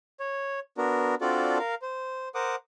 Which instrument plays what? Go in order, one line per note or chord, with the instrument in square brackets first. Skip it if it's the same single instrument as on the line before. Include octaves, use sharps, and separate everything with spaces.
[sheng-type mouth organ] C#5
B3 D4 F#4 A#4
C4 D4 F4 F#4 A4 D5
A#4 F5
C5
A#4 C5 F#5 D6 D#6